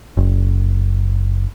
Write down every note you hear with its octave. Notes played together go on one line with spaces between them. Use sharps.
F#1